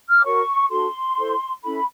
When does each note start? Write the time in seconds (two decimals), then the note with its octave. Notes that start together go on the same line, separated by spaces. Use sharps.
0.09 F6
0.18 D6
0.24 F#4 A#4 C#5 C#6
0.70 D4 F#4 A4 C6
1.17 E4 A4 C5
1.63 C#4 E4 A4 B5